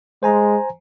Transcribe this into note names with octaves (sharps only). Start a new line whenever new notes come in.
G#3 C5 G#5 A#5